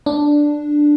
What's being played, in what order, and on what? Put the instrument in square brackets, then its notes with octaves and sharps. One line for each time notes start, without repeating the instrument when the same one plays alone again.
[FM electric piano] D4